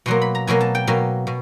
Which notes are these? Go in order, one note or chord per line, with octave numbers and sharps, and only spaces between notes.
B2 F#3 A#3 C6
B5
A#5
B2 F#3 A#3 G#5
A5
G5
B2 F#3 A#3
B2